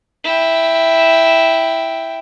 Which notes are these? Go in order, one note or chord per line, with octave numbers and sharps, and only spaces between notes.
E4 G5